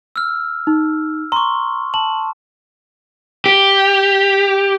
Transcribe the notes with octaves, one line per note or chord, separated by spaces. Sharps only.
E6 F6
D#4
A#5 C6 C#6
A5 F#7
G4